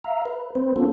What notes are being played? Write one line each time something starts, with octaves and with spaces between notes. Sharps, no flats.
E5 F5 A#5
B4
C4 B4 C5
A#3 B3 C#4 F4 A4